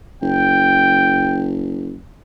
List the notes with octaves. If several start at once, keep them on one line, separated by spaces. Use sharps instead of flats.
F#1 G5